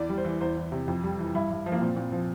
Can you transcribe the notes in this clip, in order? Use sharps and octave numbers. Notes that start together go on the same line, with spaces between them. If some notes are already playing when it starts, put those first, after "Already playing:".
Already playing: E2 D5
G3
C5
E3
E2 C5
E3
C3
F2
G3
E3
G2 E4
G2
F3
A#3
A#2 C4
A#2
F3